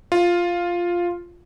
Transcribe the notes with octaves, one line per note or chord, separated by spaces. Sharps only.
F4